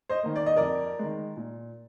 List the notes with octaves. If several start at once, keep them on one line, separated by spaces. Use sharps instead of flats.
C5 D#5
D#3 A#3
D5
D#5
F2 A#4 D5
D#3 G#3
A#2